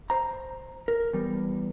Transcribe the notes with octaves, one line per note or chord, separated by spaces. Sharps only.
C5 A#5
A#4
E2 G3